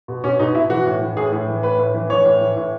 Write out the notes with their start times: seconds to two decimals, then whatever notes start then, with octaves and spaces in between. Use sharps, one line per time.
0.08 B2
0.23 B2 C#4
0.39 B2 D#4
0.55 B2 E4
0.70 E3 F#4
0.86 A2
1.01 E3
1.17 A2 G#4
1.32 A2
1.47 E3
1.63 A2 B4
1.79 A2
1.94 E3
2.10 E3 C#5
2.25 A2
2.41 E3
2.56 A2